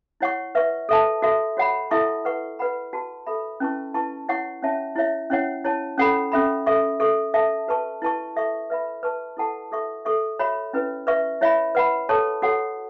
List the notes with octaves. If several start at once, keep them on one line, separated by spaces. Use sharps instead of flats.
E4 C#5 F#5 C#6
B4 E5 C#6
A4 E5 A5
F#4 A4 E5
F#4 C#5 F#5 B5
E4 A4 E5 A5 C#6
B4 F#5 C#6
B4 F#5 B5
F#4 B4 A5 C#6
A4 E5 B5
C#4 E4 B4 A5 C#6
E4 B4 A5 C#6
E4 C#5 F#5 C#6
C#4 E4 C#5 E5 A5
E4 C#5 E5
C#4 E4 C#5 F#5
E4 C#5 A5
C#4 A4 C#5 F#5 B5
C#4 A4 E5 B5
A4 E5 C#6
A4 E5 C#6
A4 E5 A5
F#4 B4 A5 C#6
E4 B4 A5 C#6
A4 E5 C#6
B4 E5 B5
B4 A5 C#6
E4 A4 F#5 A5 C#6
F#4 A4 E5 C#6
A4 E5 C#6
F#4 C#5 E5 B5
C#4 E4 B4
B4 E5 C#6
E4 C#5 E5 B5
B4 F#5 B5
A4 C#5 A5 C#6
F#4 A4 C#5 F#5